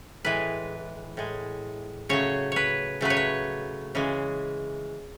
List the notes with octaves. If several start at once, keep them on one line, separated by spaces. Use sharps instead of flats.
A2 E3 G#3 B4
A2 G#3
C#3 F#3 A3 C#5
B4 C#5
C#3 F#3 A3 B4
C#5
B4
C#3 E3 G#3